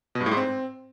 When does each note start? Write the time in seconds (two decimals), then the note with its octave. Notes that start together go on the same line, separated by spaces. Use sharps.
0.15 B2
0.21 G2
0.26 A2
0.31 G#2
0.37 C4